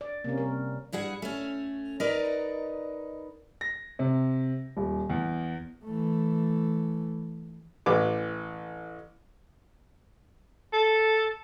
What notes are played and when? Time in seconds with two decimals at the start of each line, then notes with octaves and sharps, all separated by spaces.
0.01 D5
0.24 C3 A#3 C#4
0.38 G3 A#4
0.93 G2 E4 G#4 F#5
1.22 A3 C#4
2.00 D#4 A#4 B4 D5 D#5
3.61 A#6
3.99 C3
4.77 D#1
5.10 E2
5.85 E3 A3
7.86 A1 E3 D6
10.73 A4